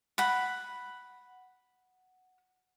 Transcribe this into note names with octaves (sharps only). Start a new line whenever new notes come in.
F#5 B5